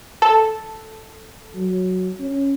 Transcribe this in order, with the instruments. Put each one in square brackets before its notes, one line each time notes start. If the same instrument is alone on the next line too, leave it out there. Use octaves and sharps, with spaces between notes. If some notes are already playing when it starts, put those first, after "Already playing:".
[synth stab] A4
[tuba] F#3
C#4